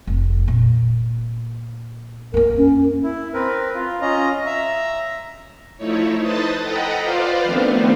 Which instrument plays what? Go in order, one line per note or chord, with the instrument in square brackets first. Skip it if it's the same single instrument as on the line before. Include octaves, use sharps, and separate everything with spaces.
[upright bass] F1
A#2
[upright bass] F#2 A#3 [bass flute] A#4
[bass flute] C#4
[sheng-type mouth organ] E4
C4 A#4 B4
F4
C#4 F4 D#5 A#5
E5 A#5
[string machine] F3 A3 D#4 E4 C#5
B4 C5 D#5 A5 D#6 A6
A4 D#5 F#5 G5 A#5 B5
F4 B4 C5 D5 F5
D#3 F3 A3 B3 C4 D4